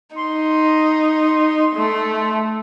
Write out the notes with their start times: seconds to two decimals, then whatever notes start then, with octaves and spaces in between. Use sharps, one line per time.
0.16 D#4 C6
1.76 A3